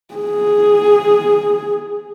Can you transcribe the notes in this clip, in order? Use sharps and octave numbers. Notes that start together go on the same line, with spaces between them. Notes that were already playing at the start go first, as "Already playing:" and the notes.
G#4